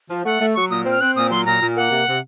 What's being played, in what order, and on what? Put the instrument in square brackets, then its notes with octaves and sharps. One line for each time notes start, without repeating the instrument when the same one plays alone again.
[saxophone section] F3
[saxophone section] A3 [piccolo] F#5
[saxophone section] A3
[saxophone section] F#3 [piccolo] C#6
[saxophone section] A#2 [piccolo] D#6
[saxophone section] C4
[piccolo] F6
[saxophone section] C4 [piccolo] F#6
[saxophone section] A#2 [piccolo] D#6
[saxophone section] F#3 [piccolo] C6
[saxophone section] A#2 [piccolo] A#5
[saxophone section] A#2
[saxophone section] A#3 [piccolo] F#5
[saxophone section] C3
C3